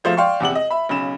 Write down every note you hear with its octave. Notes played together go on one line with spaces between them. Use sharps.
E1 F3 A3 C5 F5 E7
D5 F5 G5 C6 C#6
E2 C3 F#5 F#7
D#5
E5 B5
B1 C#3 B5 E7